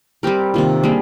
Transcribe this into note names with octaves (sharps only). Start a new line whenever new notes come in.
G3 C4 G4 A#4
C3 D#3 A#3 F4
G3 A#3 D4 G#4